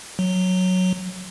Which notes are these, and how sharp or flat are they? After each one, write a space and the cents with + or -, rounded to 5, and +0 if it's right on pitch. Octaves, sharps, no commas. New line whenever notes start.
F#3 -5